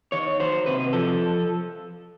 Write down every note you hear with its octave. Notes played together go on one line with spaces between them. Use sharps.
D#3 C#5
F#3 C5
C3 B4
F3 A4